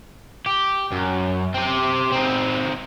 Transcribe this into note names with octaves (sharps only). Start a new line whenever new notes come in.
G4
F#2
C4 G4
C4 D#4